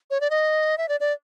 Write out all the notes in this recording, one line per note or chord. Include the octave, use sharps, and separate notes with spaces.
C#5
D5
D#5
E5
D5
D5